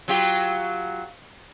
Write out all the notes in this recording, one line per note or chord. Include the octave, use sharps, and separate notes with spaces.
F#3 F4 G4